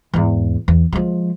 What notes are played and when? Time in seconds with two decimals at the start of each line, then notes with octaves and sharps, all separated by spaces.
0.14 E2 G#2
0.68 E2
0.92 F3 G#3